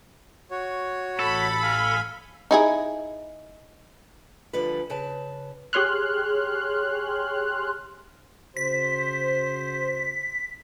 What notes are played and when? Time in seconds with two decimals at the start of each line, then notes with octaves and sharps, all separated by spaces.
0.51 F#4 C#5
1.19 A1 A4 B5
1.62 F5 G#5
2.51 D#4 E4 G#4
4.53 D2 D3 F3 G3 B4
4.90 C#3 B4 A5
5.73 G4 G#4 C#5 C6 F6 F#6
8.57 C#3 F#4 C5 B6